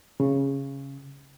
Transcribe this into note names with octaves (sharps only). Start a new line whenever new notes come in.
C#3